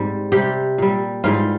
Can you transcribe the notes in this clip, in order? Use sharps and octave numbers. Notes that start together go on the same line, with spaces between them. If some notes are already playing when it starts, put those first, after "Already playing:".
Already playing: G#2 G3 C4
C3 G3 G4
A#2 G3
G#2 E3 G3 F4